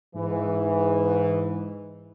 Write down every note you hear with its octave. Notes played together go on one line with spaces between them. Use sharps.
G#2 E3